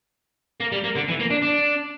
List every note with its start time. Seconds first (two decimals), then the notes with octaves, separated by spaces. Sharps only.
0.60 A#3
0.72 G3
0.84 A#3
0.96 D3
1.08 E3
1.20 A#3
1.30 D4
1.42 D4